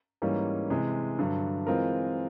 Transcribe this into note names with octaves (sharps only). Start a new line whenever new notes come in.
G#2 E3 G3 A#3 C#4
C3 E3 G#3
G2 D3 F#3
E3 G#3 C4 F4 A#4